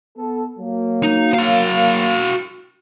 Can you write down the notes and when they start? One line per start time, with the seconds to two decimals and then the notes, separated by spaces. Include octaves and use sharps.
0.18 B3 A4
0.59 F#3 A#3
1.03 D#4
1.34 F#4 F5